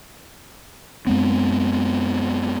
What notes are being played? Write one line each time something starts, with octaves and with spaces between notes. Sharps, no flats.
F#2 G#3 B3 C4